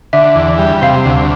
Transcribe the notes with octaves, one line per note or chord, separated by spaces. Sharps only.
D3 E5
E2
G3
C3 F5
D2